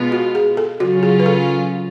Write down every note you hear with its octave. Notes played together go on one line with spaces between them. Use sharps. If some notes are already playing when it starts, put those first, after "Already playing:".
Already playing: B2 G#3 B3 F4
F#4
G#4
A4
C#3 F#3 C#4 F4 F#4
G#4
B4
A4